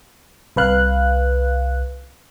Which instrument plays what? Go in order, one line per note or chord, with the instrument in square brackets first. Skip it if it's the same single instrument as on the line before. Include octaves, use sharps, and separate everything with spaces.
[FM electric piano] C2 B4 F5 F#6